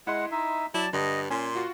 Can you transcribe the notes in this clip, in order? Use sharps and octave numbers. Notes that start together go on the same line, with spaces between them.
G#3 E4 D#5 F#5 C6
D#4 E5
F#3 E4 D5 A5
G2 D3 D#5
A#2 C#4 G#5 C6
F4 F#4